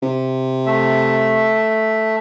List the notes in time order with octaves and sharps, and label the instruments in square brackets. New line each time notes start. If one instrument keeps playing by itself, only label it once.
[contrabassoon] C3
[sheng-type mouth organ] A3 E5